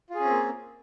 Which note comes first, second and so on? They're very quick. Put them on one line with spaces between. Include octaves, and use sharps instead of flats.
F4 G#4 C#4 C4 A#3